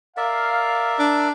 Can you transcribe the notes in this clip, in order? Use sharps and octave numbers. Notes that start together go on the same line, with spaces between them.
A#4 D5 E5 F5
D4